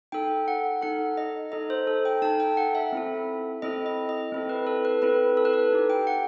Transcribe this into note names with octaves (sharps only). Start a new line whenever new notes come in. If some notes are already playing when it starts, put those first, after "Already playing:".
D#4 A4 G5
F#5
D#4 A4 F#5
D#5
D#4 A4 D#5
C5
A4
G5
D#4 A4 A5
G5
F#5
E5
C4 E4 A4
C4 E4 A4 D#5
D#5
D#5
C4 E4 A4
B4
A4
B4
C4 E4 A4 B4
A4
B4
A4
D#4 G4
G5
F#5